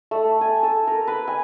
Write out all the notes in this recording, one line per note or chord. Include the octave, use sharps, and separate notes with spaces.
A3
G#5
A4
A#4
B4
G#5